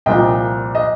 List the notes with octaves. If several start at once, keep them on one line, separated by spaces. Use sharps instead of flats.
C2 A#2 F3 D#5 G5
D#5